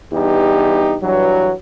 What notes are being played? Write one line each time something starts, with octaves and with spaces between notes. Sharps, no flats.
E2 G2 D#4 G4
G2 E3 F#3